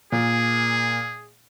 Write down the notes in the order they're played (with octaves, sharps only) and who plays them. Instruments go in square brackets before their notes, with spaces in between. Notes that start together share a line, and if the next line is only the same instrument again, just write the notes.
[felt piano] A#2 [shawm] G#4